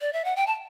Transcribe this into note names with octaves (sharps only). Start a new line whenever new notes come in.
D5
E5
F#5
G5
A5